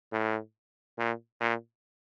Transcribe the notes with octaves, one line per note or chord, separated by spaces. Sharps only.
A2
A#2
A#2